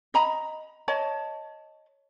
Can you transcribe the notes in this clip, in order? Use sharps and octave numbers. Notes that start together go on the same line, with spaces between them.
D#5 A#5 B5
C#5 D#5 A5